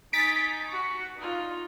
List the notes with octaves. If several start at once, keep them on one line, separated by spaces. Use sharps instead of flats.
D#4 G#5 A6 B6 D7
F#4 C#6
D#4 F4